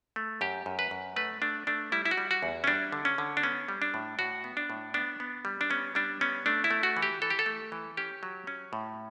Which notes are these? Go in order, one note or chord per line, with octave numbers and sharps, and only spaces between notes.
A3
F#2 G4
F#2
B4
F#2
A3 B4
A3 D4
A3 D4
G3 E4
E4
F#4
G3
F#4
E2
C#4
G3 D4
D3
C#4
D3
D4
B3 C#4
G3
D4
A2
A2 F#4
B3
D4
A2
B3 D4
B3
G3
D4
B3 C#4
G3 D4
B3 C#4
A3 D4
E4
A3
F#4
E3
G4
E3 A4
G4
A4
A3
E3
C#4 G4
F#3
C#4
A2